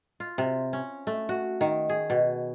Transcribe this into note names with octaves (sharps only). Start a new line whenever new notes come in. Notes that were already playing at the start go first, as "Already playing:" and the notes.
F4
C3
C#4
A3
F#4
D#3
G#4
B2